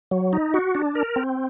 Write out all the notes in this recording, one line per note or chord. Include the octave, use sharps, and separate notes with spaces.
F#3
D#4
F#4
D4
A#4
C4